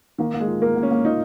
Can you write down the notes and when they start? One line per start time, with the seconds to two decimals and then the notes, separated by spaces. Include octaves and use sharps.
0.18 D#3 A#3
0.34 A#3
0.40 G#3
0.47 F4
0.62 A#3 A#4
0.76 A#3
0.83 C#4
0.91 A#3
1.05 D#4 F4